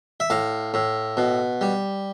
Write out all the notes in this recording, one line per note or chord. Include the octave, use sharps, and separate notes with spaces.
E5
A2 F5
A2
B2
G3